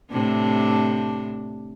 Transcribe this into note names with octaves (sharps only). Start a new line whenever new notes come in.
A2 C3 D4